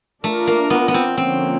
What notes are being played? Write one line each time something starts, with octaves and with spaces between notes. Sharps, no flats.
A3 D4 F4 A#4
A#3
B3
B3
C4
D3 F3 A#3 C4 C#4